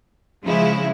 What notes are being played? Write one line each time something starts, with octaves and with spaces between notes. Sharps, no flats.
C#3 F3 G#3 E4